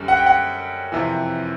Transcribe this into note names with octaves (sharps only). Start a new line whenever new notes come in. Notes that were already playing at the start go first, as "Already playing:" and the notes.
Already playing: F#2 D3 G3
F#5
G5
F#5
F2 C3 E3